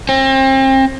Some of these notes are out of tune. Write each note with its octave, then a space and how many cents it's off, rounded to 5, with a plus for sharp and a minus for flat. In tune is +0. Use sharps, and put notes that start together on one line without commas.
C4 +35